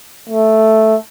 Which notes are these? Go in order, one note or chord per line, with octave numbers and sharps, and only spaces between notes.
A3